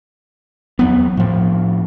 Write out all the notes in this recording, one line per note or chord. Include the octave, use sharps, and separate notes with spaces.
E2 F#3 B3
A2 F3